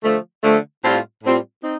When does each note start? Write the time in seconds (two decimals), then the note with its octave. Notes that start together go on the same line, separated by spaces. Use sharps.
0.03 D3 F3 A3
0.43 D3 F3 A3
0.83 A2 G3 C4 F4
1.23 A2 G3 C4 F4
1.63 C4 D#4